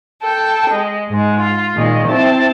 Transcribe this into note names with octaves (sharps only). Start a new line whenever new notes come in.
A4 G5
G#3
G#2 G#3
F4
A#2 D#3 G#3
C4 E4 A5